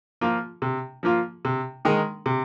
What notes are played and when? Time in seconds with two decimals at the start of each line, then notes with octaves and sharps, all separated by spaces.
0.21 F3 A#3 F4
0.62 C3
1.03 F3 A#3 F4
1.45 C3
1.85 D#3 G#3 D#4 A#4
2.26 C3